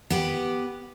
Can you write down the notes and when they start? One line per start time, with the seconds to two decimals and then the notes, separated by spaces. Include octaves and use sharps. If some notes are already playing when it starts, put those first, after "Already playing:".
0.10 B3 G4 B4